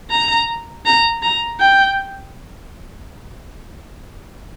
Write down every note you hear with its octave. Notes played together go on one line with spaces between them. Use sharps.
A#5
A#5
A#5
G5